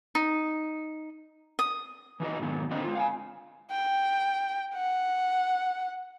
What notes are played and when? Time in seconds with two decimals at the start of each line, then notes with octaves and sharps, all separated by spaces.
0.15 D#4
1.59 D#6
2.20 E3 D#4 F#4 D#5
2.39 G#2 B2 D#3 F#3
2.71 D3 C4 D4 D#4 C5 D#5
2.83 G#3 F4
2.95 F5 G5 G#5
3.70 G5
4.74 F#5